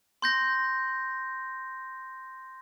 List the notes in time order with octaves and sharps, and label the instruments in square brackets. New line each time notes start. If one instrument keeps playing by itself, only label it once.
[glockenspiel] C6 G6 A#6